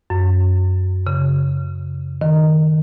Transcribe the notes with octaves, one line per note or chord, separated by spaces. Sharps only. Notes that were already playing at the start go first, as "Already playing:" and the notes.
F#2
C#3
D#3